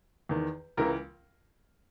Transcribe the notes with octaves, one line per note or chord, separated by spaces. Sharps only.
E2 D#3
C#2 C#3 E3 A#4